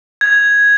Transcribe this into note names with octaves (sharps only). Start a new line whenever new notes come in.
G#6